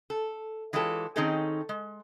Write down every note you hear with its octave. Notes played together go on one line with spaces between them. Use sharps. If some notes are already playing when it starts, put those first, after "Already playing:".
A4
E3 G#3 F4 G4 A4 C#5
D#3 C4 C#4 D#4 G#4 A4
G#3